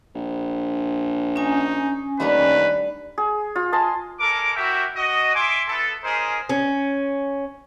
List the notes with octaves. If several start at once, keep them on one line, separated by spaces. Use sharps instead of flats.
A#1
C#4 D#4 G#5
D#2 G3 A3 D4 B4
G#4
F4
D#5 G#5 A5 C6
G#3 A4 A#4 D6
E4 F#4 G4 A#4 E5
F#4 D#5
E5 G#5 C6 D6
B3 E4 A4
C#4 D#4 G#4 A#4 C5
C#4